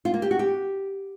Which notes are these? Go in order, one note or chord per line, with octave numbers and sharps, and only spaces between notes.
F4
A#3
G4
F#4
G4